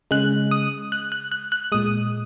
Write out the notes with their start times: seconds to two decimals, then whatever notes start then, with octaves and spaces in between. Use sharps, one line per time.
0.11 C#3 G#3 F#6
0.51 D#6
0.92 F#6
1.12 F#6
1.32 F#6
1.52 F#6
1.72 A#2 G#3 D#6